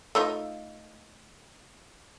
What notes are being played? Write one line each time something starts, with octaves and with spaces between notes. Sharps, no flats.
A3 D#4 F4